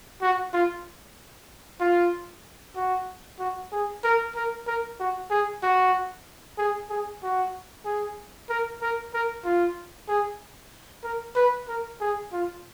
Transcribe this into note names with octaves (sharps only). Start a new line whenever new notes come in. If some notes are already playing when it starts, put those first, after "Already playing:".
F#4
F4
F4
F#4
F#4
G#4
A#4
A#4
A#4
F#4
G#4
F#4
G#4
G#4
F#4
G#4
A#4
A#4
A#4
F4
G#4
A#4
B4
A#4
G#4
F4